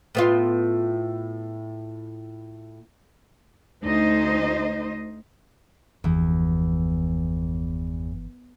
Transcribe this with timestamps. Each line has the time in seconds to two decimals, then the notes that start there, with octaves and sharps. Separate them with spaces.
0.15 A2 B3 F4
3.82 D2 D#4 C5 D#5
6.04 G1 E2 E3 F3